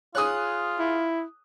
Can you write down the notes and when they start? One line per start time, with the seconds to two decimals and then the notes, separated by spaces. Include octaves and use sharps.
0.15 F4 G#4 C#5 D#6 F#6
0.79 E4